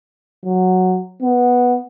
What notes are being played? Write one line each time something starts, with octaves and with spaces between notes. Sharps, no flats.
F#3
B3